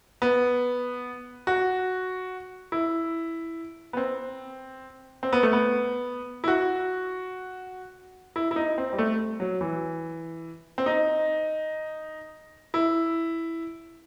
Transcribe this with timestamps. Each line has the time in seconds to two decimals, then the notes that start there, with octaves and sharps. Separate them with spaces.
0.22 B3
1.47 F#4
2.72 E4
3.93 B3
3.97 C4
5.23 C4
5.33 B3
5.43 A3
5.53 B3
6.44 E4
6.48 F#4
8.36 E4
8.51 E4
8.56 D#4
8.78 C4
8.93 G3
8.98 A3
9.40 F#3
9.61 E3
10.78 C4
10.86 D#4
12.74 E4